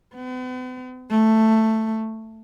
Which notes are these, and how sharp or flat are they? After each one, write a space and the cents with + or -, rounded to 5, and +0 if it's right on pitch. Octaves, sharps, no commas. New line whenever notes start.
B3 +45
A3 +5